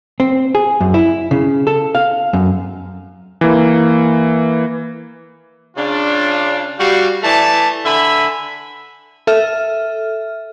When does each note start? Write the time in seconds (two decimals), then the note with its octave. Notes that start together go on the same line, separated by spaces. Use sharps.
0.20 C4
0.55 G#4
0.80 F#2
0.94 E4
1.31 C#3
1.67 A4
1.95 F5
2.33 F#2
3.41 E3 A#3
5.76 C#3 D4 F4
6.78 G3 F#4 F5
7.23 E3 A3 D5 A5
7.85 D3 E5 G#5 B5
9.27 A4 E5 F6